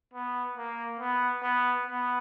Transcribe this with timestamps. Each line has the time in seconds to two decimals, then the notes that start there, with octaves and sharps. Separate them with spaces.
0.14 B3
0.57 A#3
0.99 B3
1.42 B3
1.86 B3